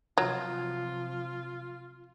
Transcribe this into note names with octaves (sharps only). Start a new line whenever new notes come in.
C3 F3 F#3 F4